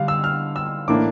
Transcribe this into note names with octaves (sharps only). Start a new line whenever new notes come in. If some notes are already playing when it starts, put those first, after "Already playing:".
Already playing: D3 G3 F5
E6
F6
E6
A2 E3 A#3 D4 D6